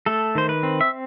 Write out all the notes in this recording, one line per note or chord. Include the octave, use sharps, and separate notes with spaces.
A3 A4
D#3 C5
B4
C4
E5